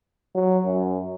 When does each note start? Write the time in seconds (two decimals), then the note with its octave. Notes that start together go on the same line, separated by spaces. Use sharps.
0.35 F#3
0.65 F#2